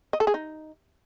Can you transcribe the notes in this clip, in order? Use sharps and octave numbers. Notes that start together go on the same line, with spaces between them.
D#5
A4
G#4
D#4